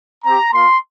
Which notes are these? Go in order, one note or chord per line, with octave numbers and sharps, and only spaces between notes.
C4 G4 A#5
A#3 F4 C6